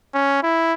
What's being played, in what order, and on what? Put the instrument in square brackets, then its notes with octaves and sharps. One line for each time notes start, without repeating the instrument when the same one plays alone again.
[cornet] C#4
E4